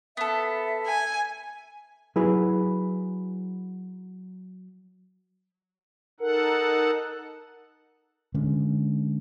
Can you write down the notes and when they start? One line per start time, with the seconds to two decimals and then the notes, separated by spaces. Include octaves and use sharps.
0.17 B3 A4 E5
0.86 G#5
2.16 F#3 E4 G#4 B4
6.20 D#4 A4 A#4 F#5
8.34 D3 G#3 C#4